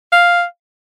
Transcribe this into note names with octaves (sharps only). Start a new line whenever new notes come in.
F5